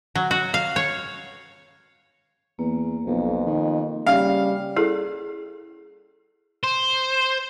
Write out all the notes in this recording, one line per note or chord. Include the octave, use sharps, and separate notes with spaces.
F#3
F#4
F5
C#5
E2 A#3
B1 F2
D#3
C#3 G3 F5
E4 G#4 A4
C5